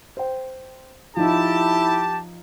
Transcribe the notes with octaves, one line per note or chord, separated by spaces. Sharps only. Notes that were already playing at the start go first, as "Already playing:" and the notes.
C5 G5
F3 D#4 E4 G4 A5